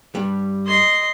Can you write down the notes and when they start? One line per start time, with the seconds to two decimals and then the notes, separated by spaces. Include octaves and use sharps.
0.15 G2 G3
0.67 D#5 C6